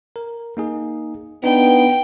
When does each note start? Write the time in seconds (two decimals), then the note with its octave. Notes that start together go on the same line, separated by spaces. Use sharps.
0.16 A#4
0.57 A#3 D#4 G#4
1.44 B3 D4 D#4 G5